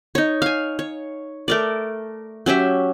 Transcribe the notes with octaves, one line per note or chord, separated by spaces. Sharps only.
D#4 C#5
F5 G#5
C#5
A3 A#4 D5
F#3 C#4 G4 E5